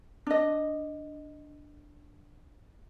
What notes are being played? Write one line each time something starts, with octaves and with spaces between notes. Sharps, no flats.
D4 D#5